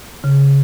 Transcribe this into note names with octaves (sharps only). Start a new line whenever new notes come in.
C#3